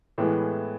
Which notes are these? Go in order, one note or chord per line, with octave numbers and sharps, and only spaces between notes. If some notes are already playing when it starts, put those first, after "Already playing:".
A2 E3 G#3 B3